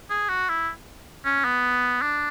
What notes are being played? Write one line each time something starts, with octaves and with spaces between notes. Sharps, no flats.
G#4
F#4
E4
C#4
B3
D4